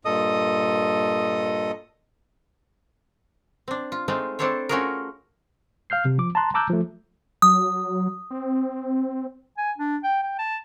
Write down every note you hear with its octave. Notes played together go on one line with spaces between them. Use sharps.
G2 A#2 A4 D#5 D#6
C4 D4
F4
G#3 A3 C4 D#4 F4
C4 D4 E4 A4 C5 C#5
A3 C#4 F4 F#4 G#4 A#4
F5 F6 G6 C7
C3
F3 D6
A5 A#5 C6 F#6
A5 A#5 D6 E6 F#6 G6
F3 A3
F#3 D#6
C4
G#5
D4
G5
G5
A5